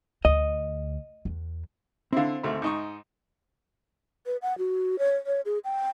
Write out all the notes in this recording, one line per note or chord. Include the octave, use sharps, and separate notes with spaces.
D2 D#5
E2
D3 C4 E4 F5
G#1 D2 A3
G#2 D#4 C#6
B4
F#5
F#4
C#5
C#5
G#4
G5